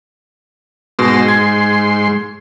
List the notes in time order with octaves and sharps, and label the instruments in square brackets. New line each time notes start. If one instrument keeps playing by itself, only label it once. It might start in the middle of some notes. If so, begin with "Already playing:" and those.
[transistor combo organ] G#2 C6 [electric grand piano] B2
[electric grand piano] G#6